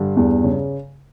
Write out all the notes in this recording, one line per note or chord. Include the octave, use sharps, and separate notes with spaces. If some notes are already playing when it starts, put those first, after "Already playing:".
Already playing: G2 D3
E2
C#3